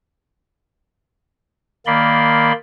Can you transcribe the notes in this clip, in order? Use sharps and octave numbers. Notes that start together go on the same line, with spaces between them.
D#3 A#3 D5 B5 C6